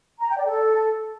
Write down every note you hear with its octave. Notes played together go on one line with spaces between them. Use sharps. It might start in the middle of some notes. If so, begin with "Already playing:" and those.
A#5
G5
D5
A4